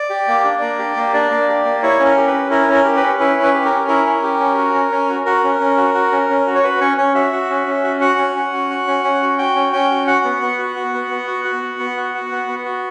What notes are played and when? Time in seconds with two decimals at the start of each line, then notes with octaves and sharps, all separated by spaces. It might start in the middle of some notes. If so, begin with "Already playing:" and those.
Already playing: D5
0.10 G4
0.28 A#3
0.45 D4
0.61 A#3
0.79 G4
0.96 A#3
1.14 D4 D5
1.31 A#3
1.48 G4
1.65 A#3
1.83 E4 C#5
1.99 C#4
2.05 A#4
2.17 G4
2.27 B4
2.33 C#4
2.50 E4 A#4
2.69 C#4 A#4
2.85 G4
2.97 B4
3.03 C#4
3.20 E4 B4
3.37 C#4
3.43 B4
3.54 G4
3.66 A#4
3.71 C#4
3.88 E4 A#4
4.06 C#4
4.23 G4
4.39 C#4
4.58 F#4
4.74 C#4
4.91 C#4
5.09 F#4
5.26 F#4 A#4
5.44 C#4
5.60 C#4
5.77 F#4
5.94 F#4
6.11 C#4
6.30 C#4
6.47 F#4
6.55 C#5
6.63 F#4 B4
6.81 C#4 C#5
6.97 C#4 C#5
7.15 F#4 E5
7.33 F#4
7.50 C#4
7.67 C#4
7.84 F#4
8.01 F#4 F#5
8.19 C#4
8.36 C#4
8.53 F#4
8.70 F#4
8.87 C#4
9.04 C#4
9.22 F#4
9.38 F#4 G5
9.56 C#4
9.73 C#4 G5
9.91 F#4
10.07 F#4 F#5
10.25 B3
10.42 B3
10.59 F#4
10.76 F#4
10.94 B3
11.11 B3
11.27 F#4
11.45 F#4
11.63 B3
11.79 B3
11.97 F#4
12.14 F#4
12.32 B3
12.48 B3
12.65 F#4